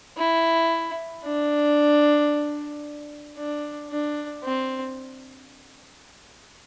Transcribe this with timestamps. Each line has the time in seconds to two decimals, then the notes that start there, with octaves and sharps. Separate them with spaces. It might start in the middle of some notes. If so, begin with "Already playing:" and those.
0.17 E4
1.24 D4
3.37 D4
3.90 D4
4.43 C4